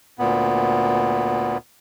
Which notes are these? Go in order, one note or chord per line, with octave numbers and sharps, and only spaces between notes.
D2 A#2 B3